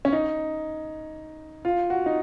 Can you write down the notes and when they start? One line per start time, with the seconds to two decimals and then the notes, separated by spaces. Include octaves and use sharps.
0.05 C#4
0.13 D#4
1.65 F4
1.90 F#4
2.06 D#4